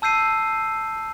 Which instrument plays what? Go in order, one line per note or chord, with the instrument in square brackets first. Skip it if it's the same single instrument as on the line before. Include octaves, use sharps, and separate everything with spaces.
[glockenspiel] A5 E6 G6 C7 D#7